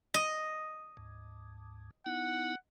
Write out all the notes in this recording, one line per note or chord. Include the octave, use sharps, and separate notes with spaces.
D#5
D2 G#2
B3 D#4 E4 F#5